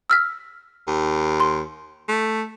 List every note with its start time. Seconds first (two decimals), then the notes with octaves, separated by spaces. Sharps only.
0.10 E6 F6 B6
0.88 D#2
1.40 C6
2.09 A3